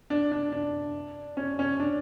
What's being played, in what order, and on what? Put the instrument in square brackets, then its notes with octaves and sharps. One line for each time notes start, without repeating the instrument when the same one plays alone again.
[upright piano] D4
D4
D4
C#4
C#4
D4